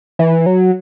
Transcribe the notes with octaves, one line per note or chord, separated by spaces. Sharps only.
E3
F#3